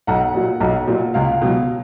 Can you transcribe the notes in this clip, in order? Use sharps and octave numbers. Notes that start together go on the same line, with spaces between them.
B1 F#5
A#2 F#3
B1
A#2 F#3
C#2 F5
B2 F#3